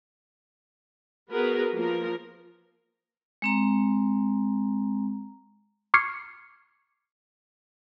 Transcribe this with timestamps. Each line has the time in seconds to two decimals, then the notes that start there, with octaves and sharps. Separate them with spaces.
1.31 B3 F#4 G#4 A#4 B4
1.73 F3 A#3 B3 A#4
3.42 G#3 C4 A#5
5.94 C#6 D6 F6 G#6 C7 C#7